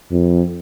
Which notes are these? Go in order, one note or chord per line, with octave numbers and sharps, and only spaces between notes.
F2